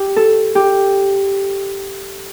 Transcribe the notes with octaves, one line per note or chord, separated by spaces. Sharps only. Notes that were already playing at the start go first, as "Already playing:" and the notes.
Already playing: G4
A4
G4